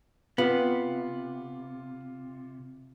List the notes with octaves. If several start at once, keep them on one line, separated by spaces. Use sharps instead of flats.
C3 B3 F4